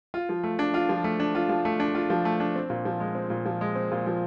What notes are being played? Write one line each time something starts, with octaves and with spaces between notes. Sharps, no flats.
F4
F3
A3
D4
F4
F3
A3
D4
F4
F3
A3
D4
F4
F3
A3
D4
C4
A#2
F3
G#3
C4
A#2
F3
G#3
C4
A#2
F3